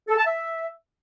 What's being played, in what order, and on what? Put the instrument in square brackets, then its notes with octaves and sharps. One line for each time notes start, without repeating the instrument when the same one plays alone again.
[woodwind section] A4
A5
E5